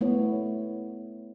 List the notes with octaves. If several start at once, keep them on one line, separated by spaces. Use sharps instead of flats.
A3 B3 E4 C#5